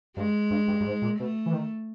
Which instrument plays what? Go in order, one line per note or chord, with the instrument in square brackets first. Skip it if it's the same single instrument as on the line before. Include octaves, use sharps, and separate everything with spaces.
[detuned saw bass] G2 [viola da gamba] G#3
[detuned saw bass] G2
G2
G2
G#2
A#2
[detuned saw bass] B2 [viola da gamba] A3
[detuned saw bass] E3
D#3